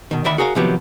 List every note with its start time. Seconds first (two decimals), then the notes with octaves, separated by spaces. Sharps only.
0.11 B2 D#3
0.24 D2 D#3 D5 E5 B5
0.38 F#4 G#4 A#4 C#5 D#5 F5
0.55 C3 D#3 F3 F#3 B3 G4